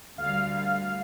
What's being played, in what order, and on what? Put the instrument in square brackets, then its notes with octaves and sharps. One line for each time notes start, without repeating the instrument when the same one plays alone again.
[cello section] D2 G3 [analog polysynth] F5